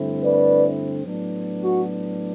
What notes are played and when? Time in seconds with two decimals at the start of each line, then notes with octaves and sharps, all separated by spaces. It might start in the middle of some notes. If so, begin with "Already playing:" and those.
Already playing: G2 D3 A3 C4 E4
0.22 B4 D5
1.06 A2 F#3 B3 D4
1.63 F#4